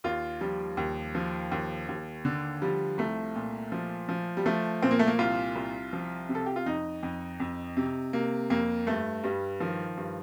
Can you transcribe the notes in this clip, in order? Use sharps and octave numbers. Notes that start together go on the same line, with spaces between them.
D#2 F4
F3 G3
D#2
F3
D#2
D#2
D3
F3 G3
C2 A3
A#2
F3
F3
G3
F3 A3
A#2 C4
A#3
A3
A#3
C2 F4
C2
F3
C3
A4
G4
F4
F2 D#4
F2
F2
C3
C3 A#3
F2 A#3
G2 A3
G2 G3
D#3 F3
G2